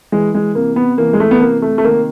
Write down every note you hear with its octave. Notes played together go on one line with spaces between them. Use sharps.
E3 G#3
G#3
C3 A#3
B3
E3 A#3
G#3
A3
B3
C3 A#3
A3
A3
D#3 A#3